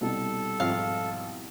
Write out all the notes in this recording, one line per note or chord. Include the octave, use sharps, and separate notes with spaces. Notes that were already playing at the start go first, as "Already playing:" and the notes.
C2 B2 G3 A4
G#1 F3 F5 F6